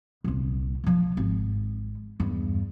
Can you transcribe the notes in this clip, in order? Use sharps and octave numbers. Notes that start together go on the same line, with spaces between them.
D#1 C2
A#1 F3
G#1
E2 G2